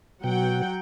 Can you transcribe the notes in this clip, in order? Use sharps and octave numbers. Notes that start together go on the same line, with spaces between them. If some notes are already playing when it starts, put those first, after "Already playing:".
B2 F#3 F#5 G5